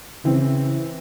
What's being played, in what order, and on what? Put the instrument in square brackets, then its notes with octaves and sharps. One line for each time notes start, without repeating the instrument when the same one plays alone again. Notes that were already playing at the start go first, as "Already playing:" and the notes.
[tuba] C#3 [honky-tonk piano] E3 C4